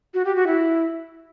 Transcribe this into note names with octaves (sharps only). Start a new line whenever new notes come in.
F#4
G4
F#4
E4